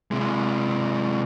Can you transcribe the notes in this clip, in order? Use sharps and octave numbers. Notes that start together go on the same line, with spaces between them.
C3 G#3